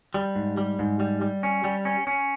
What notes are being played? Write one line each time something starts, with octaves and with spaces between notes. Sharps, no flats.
G3
G#2
G3
G#2
G3
G3
C#4
G3
C#4
C#4